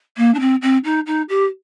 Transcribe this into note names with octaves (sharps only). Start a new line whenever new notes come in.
A#3
D4
C4
C4
D#4
D#4
G4